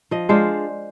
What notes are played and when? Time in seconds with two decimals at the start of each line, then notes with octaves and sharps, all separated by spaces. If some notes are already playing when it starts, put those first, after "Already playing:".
0.11 F3 D#5
0.29 G#3 D4 F4 C5